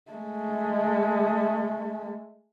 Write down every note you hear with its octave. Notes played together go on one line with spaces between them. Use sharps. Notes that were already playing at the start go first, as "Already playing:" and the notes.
G#3 A3